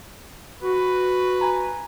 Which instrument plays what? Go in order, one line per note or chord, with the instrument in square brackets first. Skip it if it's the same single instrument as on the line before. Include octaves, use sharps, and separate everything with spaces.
[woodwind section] F#4 [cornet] B4
[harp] G#5 A#5